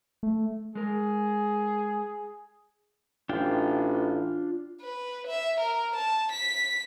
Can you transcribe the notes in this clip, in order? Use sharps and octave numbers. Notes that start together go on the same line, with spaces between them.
A3
G#3 G#4 A#4
A1 D4 F4 G5
B4
E5
A#4
A5
B6